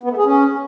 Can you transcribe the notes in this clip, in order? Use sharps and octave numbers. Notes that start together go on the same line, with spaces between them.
B3
A3
G#4
C#4